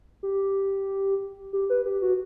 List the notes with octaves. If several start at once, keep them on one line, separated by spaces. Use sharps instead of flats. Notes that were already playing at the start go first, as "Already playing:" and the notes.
G4
G4
B4
G4
F#4